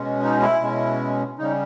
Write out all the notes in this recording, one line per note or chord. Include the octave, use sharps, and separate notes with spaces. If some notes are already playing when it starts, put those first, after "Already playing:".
Already playing: B2 G#3 C#4
D#4
E4
B2 G#3 C#4
C#3 G3 C#4 D#4